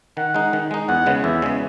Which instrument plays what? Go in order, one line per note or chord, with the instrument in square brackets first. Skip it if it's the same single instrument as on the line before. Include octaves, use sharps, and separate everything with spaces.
[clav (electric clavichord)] D#3 [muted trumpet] F#5
[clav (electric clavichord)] G#3 D#4
D#3
G#3 D#4
[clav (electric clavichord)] E2 [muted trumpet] F#5
[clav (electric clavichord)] C#3 G#3 B3
[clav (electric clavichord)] E2 [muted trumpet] E5
[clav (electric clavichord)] C#3 G#3 B3